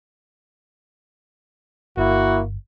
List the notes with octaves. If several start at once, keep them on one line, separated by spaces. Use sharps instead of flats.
G1 A#3 E4 F#4